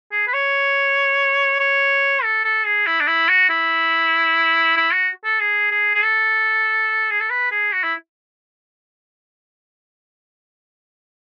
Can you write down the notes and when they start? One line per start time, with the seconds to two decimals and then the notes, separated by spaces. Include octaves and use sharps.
0.12 G#4
0.27 B4
0.33 C#5
1.60 C#5
2.23 A4
2.44 A4
2.65 G#4
2.87 E4
3.00 D4
3.08 E4
3.29 F#4
3.49 E4
4.77 E4
4.92 F#4
5.24 A4
5.40 G#4
5.71 G#4
5.95 G#4
6.03 A4
7.10 G#4
7.20 A4
7.30 B4
7.51 G#4
7.73 F#4
7.83 E4